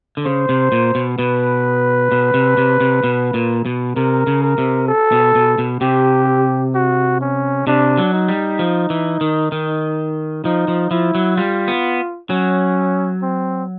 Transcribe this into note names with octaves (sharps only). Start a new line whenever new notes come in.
D3
C#3 C5
C3
A#2
B2
B2 B4
B2
C3
C3
C3
B2
A#2
B2
C3 A#4
C#3
A#4
C3
A4
B2
B2
B2
C3 G4
F#4
C#4
C3 D4
F#3
D#4
G3
F3
E3
D#3
D#3
F3 D#4
F3
F3 E4
F#3
G3 F4
B3
F#3 C#4
C4